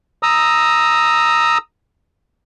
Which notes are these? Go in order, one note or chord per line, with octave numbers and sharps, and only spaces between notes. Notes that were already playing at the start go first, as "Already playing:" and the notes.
A#5 D#6 E6